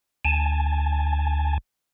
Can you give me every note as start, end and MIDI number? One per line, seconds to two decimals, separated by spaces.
0.25 1.58 38
0.25 1.58 80
0.25 1.58 81